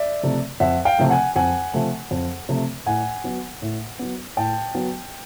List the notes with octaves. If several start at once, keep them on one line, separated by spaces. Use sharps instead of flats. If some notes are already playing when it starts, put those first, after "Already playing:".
Already playing: D5 E5
C3 F3 A3
F2 E5 F#5
F5 G5
C3 F3 A3
F#5 G#5
F2 F#5 G#5
C3 F3 A3
F2
C3 F3 A3
A2 F#5 G#5
F#3 B3
A2
F#3 B3
A2 G5 A5
F#3 B3